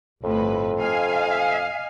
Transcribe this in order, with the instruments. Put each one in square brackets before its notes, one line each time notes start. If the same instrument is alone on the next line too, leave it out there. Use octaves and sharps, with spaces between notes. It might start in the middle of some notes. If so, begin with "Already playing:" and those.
[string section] G1 A2 B4 [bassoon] F2
[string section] D#5 F5 G#5